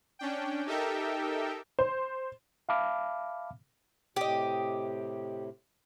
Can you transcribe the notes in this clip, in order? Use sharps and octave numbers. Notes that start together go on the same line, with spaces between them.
C#4 D4 G5
D#4 G4 A4 A#4 E5 G5
C5
E5 F5 A5 B5 D6 F6
A2 C3 G4 D#5